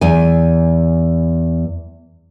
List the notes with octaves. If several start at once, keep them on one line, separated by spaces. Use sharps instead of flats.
E2 G#5